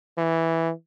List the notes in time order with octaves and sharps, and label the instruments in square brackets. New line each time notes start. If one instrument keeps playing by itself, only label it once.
[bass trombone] E3